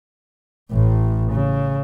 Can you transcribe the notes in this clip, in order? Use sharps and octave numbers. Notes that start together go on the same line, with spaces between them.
A1 A2
C#3